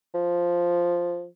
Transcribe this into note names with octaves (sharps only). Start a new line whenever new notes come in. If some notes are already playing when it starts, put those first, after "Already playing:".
F3